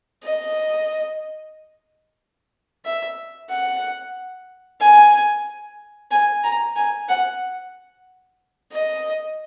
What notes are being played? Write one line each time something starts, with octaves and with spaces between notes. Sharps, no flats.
D#5
E5
F#5
G#5
G#5
A#5
G#5
F#5
D#5